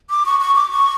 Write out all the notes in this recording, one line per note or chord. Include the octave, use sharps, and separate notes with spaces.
D6
C#6
C#6
D6
C#6